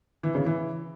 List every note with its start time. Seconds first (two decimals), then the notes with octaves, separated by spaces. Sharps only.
0.23 E3
0.35 C#3
0.46 E3